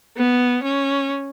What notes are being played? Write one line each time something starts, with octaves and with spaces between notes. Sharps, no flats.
B3
C#4